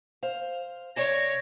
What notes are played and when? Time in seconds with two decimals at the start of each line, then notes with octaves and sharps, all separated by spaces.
0.23 C5 F5
0.96 C3 C#5 D5 A#6